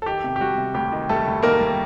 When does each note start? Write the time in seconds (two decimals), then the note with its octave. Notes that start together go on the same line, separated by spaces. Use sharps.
0.02 A4
0.06 D#3 G4
0.24 C3
0.36 G4
0.40 G3 F#4
0.58 C3
0.74 D2 G4
0.92 D#3
1.09 G3 A3 A4
1.27 D2
1.43 D#3 A#3 A#4
1.60 G3